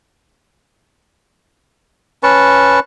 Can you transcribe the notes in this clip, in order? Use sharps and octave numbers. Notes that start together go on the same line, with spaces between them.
C#4 B4 A5 C#6